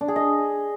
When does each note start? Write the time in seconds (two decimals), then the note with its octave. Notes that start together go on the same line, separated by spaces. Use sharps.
0.01 D4
0.08 G#4
0.16 D#5